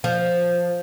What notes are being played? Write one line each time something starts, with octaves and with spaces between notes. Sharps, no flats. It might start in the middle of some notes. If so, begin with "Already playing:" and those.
F3